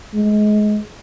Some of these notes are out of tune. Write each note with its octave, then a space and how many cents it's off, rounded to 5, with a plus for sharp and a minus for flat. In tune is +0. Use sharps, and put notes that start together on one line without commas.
G#3 +25